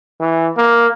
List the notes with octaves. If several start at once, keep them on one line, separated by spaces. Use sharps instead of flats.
E3
A#3